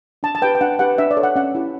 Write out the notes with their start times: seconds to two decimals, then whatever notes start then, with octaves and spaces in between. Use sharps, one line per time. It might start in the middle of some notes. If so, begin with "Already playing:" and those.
0.23 D4 A5
0.35 A5
0.42 G4 B4 G5
0.55 G5
0.61 D4 F#5
0.79 G4 B4 F#5
0.98 D4 E5
1.11 D5
1.17 A4 C#5
1.23 F#5
1.36 C#4 F#5
1.55 E4 G4